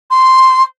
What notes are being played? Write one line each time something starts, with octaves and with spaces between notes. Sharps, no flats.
C6